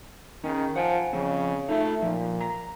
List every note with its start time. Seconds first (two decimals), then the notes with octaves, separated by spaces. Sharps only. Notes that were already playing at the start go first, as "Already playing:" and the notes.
0.44 D#3 C#4 G#4
0.76 F3 F#5 G#5
1.13 C#3 F3 C4
1.69 A3 D#4 F4
2.02 A#2 F3
2.41 A#5